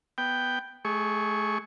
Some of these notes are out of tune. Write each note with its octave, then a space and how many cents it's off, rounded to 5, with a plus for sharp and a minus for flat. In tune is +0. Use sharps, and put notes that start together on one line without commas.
B3 +0 G5 +0
A3 -35 G#4 -15 C#6 +0